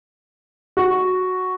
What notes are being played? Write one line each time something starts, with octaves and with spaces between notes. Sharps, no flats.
F#4